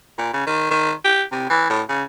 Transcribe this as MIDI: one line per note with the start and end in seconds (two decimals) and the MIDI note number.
0.18 0.31 46
0.33 0.44 49
0.46 0.69 51
0.70 0.92 51
1.04 1.22 67
1.32 1.49 48
1.50 1.65 52
1.70 1.82 45
1.89 2.03 49